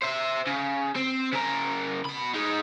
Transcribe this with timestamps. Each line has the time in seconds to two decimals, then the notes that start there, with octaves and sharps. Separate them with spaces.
0.03 C5 E5
0.47 C#3
0.96 C4
1.32 C#3 A#4
2.06 B2 B5
2.34 G#3 D#4